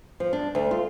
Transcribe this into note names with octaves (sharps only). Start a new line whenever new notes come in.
F3
D4
D2
F4